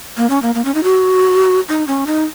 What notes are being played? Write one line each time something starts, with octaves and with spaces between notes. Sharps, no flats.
A#3
C#4
A#3
A#3
C#4
D#4
F#4
D#4
C#4
D#4